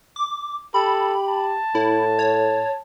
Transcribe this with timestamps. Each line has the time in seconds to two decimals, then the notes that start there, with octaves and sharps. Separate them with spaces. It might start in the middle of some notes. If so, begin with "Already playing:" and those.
0.16 D6
0.74 G4 A4 B5
1.28 A5
1.75 A2 E4
2.19 C#5